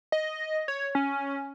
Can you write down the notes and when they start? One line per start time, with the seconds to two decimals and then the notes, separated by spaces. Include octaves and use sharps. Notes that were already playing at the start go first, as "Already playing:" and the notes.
0.12 D#5
0.68 C#5
0.95 C#4